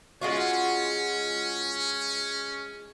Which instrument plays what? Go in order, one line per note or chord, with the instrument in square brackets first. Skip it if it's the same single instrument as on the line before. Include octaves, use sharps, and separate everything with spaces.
[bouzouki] G#3 F4 F#4 [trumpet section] C#4